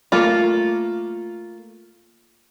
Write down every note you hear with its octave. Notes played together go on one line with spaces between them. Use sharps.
A3 A#3 F4